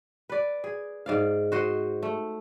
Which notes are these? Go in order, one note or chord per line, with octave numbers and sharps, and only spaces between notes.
B4 D5
G#4
G#2 D5 F5
F#4 C5 D#5
A3